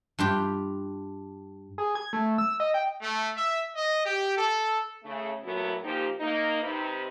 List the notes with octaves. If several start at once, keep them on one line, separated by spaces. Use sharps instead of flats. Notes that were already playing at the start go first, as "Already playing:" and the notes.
G2 F4 G4
G#4
G#6
A3
E6
D#5
G5
A3
E5
D#5
G4
A4
C#3 A3
F#2 A#2 F#3 A3 B3 E4
A#2 F3 A#3 D#4 G4
A#3 D#4
C3 D#4 B4